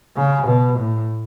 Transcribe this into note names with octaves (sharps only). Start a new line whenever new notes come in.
C#3
B2
A2